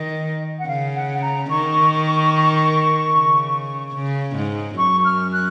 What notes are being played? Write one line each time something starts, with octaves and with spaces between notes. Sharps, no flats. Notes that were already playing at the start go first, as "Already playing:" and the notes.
Already playing: D#3 D#5
F#5
C#3 F5
F#5
A#5
D#3 C#6
C#3
C#3
G#2
F#2 C#6
F6
F#6